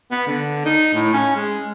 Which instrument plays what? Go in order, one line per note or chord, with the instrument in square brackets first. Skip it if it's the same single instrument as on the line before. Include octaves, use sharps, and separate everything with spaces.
[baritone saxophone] B3
D3
D#4
A2
C#4
G#3